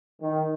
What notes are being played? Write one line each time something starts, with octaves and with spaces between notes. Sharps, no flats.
D#3